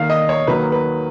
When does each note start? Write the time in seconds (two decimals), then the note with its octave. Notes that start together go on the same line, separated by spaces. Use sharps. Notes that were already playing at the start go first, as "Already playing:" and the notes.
Already playing: D#2 D#3 A#3 F5
0.10 D#5
0.29 C#5
0.47 D#2 D#3 F#3 A#3 B4
0.72 B4